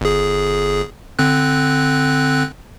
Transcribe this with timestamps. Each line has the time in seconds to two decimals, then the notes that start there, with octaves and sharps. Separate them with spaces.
0.01 G1 G#4
1.19 D3 C4 F#6